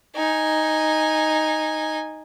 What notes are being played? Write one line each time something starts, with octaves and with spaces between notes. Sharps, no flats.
D#4 G#5